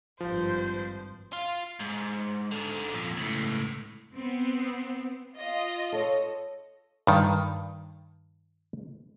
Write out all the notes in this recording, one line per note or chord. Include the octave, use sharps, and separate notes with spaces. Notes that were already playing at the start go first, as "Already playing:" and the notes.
G#1 G2 F3 C5
F4
G#2
G#2 D3
F2 A#2
C#2 A2
B3 C4
F4 D#5
A4 C#5
G2 D#3